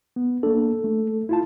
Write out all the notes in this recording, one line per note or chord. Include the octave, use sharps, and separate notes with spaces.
B3
A#3 D4 A4
A3
E4 F4 A5